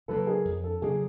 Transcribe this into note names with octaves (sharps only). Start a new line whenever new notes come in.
C#3 F#3 A#3 A4 B4
G#4 A#4
F2
A4
C#3 F#3 A#3 G#4